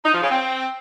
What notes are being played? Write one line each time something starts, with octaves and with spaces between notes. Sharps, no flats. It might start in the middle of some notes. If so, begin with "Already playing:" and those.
D#4
F3
C#3
C4